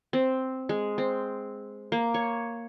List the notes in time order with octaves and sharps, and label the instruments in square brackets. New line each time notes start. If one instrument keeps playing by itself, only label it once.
[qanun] C4
G#3
C4
A#3
C#5